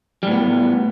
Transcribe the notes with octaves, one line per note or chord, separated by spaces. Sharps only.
A2 G3 B3